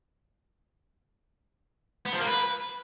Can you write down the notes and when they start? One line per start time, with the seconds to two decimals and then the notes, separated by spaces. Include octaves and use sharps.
2.05 B3
2.13 F3
2.20 A#3
2.27 B4